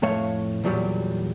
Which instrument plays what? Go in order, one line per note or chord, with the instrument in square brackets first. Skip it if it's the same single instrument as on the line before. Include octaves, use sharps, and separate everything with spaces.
[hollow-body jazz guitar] F2 A2 A3 C#5 F5
E2 A#2 F#3 G3